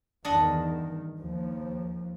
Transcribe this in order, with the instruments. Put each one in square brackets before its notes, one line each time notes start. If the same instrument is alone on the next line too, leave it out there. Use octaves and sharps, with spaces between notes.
[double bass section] E2 G2 D#3 [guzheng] D4 D#5 F#5
[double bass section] D#2 F3